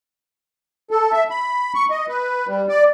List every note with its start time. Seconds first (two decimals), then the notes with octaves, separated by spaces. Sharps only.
0.91 A4
1.12 E5
1.30 B5
1.74 C#6
1.91 D#5
2.08 B4
2.47 G3
2.69 D5